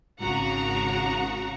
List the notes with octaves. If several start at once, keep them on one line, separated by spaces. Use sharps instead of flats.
G#1 C#3 F#4 F#5 A#5